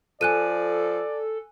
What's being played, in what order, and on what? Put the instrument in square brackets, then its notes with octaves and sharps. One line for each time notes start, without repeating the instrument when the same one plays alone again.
[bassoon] F3 [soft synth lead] A4 [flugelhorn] D5 [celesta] G#5 F#6 D#7